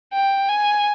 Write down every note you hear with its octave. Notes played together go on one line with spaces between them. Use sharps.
G5
G#5